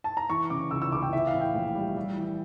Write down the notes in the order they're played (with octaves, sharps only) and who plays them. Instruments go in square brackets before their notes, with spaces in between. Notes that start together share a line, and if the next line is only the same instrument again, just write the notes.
[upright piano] A5
A#5
E3 C#6
C#3 D6
C#2 E6
E6
C#2 D6
G5
E3 E5
F5
A2
G5
A#1
G3
G3
E3